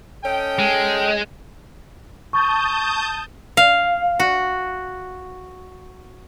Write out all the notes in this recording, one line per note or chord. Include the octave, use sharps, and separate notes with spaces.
C#4 A4 D#5 G5
G#3
A5 C#6 D#6 G6
F5
F#4